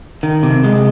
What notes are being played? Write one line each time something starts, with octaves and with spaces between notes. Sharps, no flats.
D#3
C3
G#3